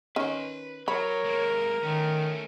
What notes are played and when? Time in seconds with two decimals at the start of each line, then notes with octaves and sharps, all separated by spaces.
0.16 D#3 C#4 B4 C6
0.88 F#3 A#4 C#5 B5
1.25 G#3 A#3
1.83 D#3 A3 C#4